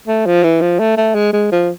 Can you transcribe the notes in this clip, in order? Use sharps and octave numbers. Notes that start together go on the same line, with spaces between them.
A3
F3
E3
F3
A3
A3
G#3
G#3
F3